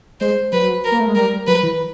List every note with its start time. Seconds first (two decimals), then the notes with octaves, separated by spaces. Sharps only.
0.21 G#3 C5
0.53 F#3 B4
0.84 A#4
0.92 A#3
1.00 A3
1.08 G#3
1.15 G3 A#4
1.47 F#3 B4
1.63 E3